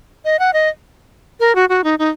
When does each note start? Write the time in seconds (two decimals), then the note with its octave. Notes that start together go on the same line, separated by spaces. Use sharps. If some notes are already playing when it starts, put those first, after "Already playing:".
0.25 D#5
0.39 F#5
0.53 D#5
1.40 A#4
1.55 F#4
1.69 F#4
1.84 D#4
1.99 D#4